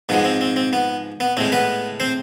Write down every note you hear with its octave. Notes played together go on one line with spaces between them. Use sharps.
G#2 F3 G#3 B3
C4
C4
C4
B3
B3
A2 G#3 C4
B3 B4
C4 C5